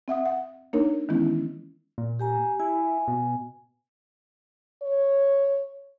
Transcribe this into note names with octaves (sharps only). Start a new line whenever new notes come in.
C4 E5 F#5 D#6
F#5
A#3 D4 D#4 A#4 C#5
D#3 E3 G#3 B3 C#4 E4
A#2
G4 G#5 A#5
E4 G#5
B2
C#5